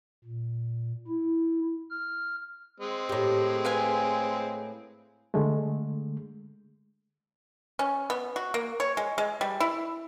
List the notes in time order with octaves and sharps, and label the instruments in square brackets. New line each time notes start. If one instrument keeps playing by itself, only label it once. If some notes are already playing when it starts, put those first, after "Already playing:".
[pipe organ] A#2
E4
F6
[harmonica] G#3 C4
[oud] A2 G4
[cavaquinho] B4 F5 G#5
[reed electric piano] D3 G#3 A3
[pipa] C#4
B3
F#4
A#3
C#5
G#3
G#3
G3
E4